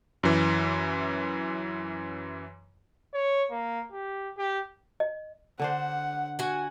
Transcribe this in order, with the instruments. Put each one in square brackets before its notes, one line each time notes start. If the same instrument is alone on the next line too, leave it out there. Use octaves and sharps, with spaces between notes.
[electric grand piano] F#2 E3
[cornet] C#5
A#3
G4
G4
[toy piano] D#5
[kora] D3 D4 C5 [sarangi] F#5
[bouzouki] F#4 G#5